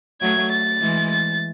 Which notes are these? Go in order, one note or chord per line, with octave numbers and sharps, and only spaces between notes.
F#3 A3 G#6
A6
E3 G#3
A6